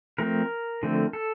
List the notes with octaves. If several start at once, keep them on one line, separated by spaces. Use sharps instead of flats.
F3 A3 C4 A#4
D3 F3 A3 C4
A4